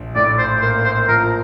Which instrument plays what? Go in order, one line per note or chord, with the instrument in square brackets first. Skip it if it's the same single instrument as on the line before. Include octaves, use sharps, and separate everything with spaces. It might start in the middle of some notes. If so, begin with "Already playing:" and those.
Already playing: [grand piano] A#1
[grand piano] A2 [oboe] D5
[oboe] C5
[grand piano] A#3 [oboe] C5
[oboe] C5
[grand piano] F3 [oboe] A#4